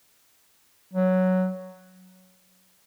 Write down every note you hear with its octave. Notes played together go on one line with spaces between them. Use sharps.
F#3